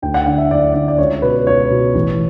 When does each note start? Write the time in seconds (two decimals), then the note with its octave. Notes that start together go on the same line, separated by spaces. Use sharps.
0.02 D2 G5
0.14 F#5
0.26 D3 F#5
0.38 E5
0.51 D2 D5
0.74 D3 D5
0.88 D5
0.98 C#2 C#5
1.22 B2 B4
1.46 C#2 C#5
1.71 B2
1.95 A1